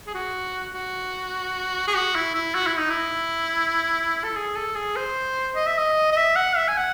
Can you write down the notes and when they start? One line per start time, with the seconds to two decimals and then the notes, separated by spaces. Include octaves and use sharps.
0.07 G#4
0.14 F#4
0.74 F#4
1.87 G#4
1.95 F#4
2.15 E4
2.34 E4
2.55 F#4
2.67 E4
2.78 D#4
2.90 E4
4.24 A4
4.36 G#4
4.56 A4
4.75 G#4
4.96 C5
5.55 D#5
5.67 E5
5.78 D#5
6.12 D#5
6.16 E5
6.36 F#5
6.56 E5
6.68 G#5
6.77 F#5